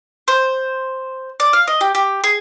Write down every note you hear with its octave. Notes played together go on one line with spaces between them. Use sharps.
C5
D5
F5
D#5
G4
G4
G#4